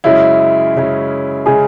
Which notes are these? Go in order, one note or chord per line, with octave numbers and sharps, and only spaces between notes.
F#2 C#3 G#3 C#4 E4
F#2 C#3 G#3 C#4
C#3 G#3 C#4 G#4